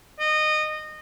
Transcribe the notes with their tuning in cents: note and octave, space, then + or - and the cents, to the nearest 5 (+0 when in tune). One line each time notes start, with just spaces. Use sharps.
D#5 -20